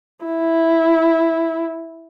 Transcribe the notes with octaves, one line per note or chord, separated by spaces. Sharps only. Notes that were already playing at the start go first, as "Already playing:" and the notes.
E4